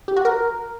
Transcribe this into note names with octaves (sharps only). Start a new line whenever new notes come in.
G4
F#4
A#4